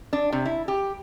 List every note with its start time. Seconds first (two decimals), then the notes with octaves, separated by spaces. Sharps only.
0.13 D4
0.32 C3
0.45 E4
0.68 G4